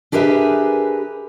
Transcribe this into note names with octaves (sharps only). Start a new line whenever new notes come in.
D4 G4 G#4 A#4 B4 E5